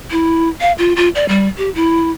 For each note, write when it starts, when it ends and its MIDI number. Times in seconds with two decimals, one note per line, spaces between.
0.11 0.49 64
0.61 0.72 77
0.78 0.93 65
0.96 1.09 65
1.15 1.26 74
1.29 1.48 55
1.58 1.70 67
1.75 2.11 64